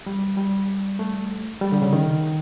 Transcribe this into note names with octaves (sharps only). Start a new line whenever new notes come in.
G3
G3
A3
G3
D3
C#3
D#3